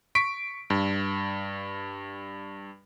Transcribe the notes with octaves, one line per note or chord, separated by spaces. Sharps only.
C#6 B6 D7
G2